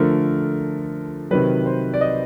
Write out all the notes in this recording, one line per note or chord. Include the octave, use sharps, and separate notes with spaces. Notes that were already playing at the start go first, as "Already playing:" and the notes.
Already playing: D3 F3 A3 A#4
C3 D#3 F#3 B4
C5
D5
D#5